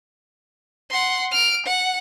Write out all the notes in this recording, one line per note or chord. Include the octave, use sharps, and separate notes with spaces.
F#5 C6
F6 D7
F#5